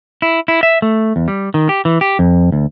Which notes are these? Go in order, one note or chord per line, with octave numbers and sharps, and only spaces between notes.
E4
E4
E5
A3
E2
G3
D#3
G4
E3
G4
F2
D2